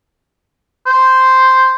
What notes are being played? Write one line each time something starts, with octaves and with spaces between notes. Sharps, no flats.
C5